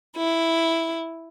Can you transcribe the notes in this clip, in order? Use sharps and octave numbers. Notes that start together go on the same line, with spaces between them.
E4